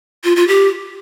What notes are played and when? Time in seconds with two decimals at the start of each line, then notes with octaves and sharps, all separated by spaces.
0.24 F4
0.36 F4
0.48 G4